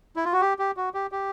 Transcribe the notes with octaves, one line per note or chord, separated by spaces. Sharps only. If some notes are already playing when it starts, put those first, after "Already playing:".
E4
F4
F#4
G4
G4
F#4
G4
G4